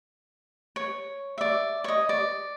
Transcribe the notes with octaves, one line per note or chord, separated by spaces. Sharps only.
C#5
D5 E5
C#5 D#5
D5